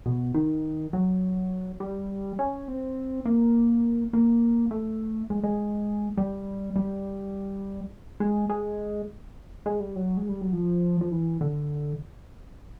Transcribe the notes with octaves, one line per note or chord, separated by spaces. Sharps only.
B2
D#3
F#3
G3
C#4
C4
A#3
A#3
A3
G#3
G#3
G3
G3
G#3
G#3
G#3
G3
F#3
G#3
G3
F#3
F3
F3
E3
D3